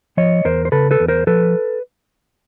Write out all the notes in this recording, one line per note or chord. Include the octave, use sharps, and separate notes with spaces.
F3 C#5 D#5
E2 A#4 C5
C5
C#3 A4 B4
A4 B4
E2
A#4 C5
F3 A4 B4